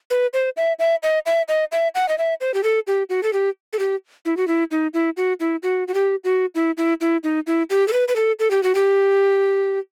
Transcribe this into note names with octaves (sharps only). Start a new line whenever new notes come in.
B4
C5
E5
E5
D#5
E5
D#5
E5
F#5
D#5
E5
C5
G4
A4
G4
F#4
A4
G4
A4
G4
E4
F#4
E4
D#4
E4
F#4
E4
F#4
F#4
G4
F#4
E4
E4
E4
D#4
E4
G4
A4
B4
B4
A4
A4
G4
F#4
G4